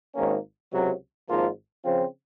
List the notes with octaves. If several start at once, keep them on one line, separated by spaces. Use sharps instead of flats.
G#1 G#2 D#3 A#3 C#4
C#2 C3 F#3
G#1 G#2 F3 A#3 F4
C#3 F3 C4 F4 C5